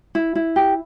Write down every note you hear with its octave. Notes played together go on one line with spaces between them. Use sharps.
E4
E4
G4